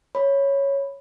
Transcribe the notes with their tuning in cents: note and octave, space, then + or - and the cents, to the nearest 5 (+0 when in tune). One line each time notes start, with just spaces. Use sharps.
C#5 +0 B5 +0